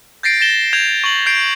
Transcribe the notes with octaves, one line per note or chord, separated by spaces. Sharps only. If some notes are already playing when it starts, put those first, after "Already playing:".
G6 A6 A#6 C7 D7
A6 A#6 E7 G7
G6 G#6 F7
C#6 F#7
G6 C7 D7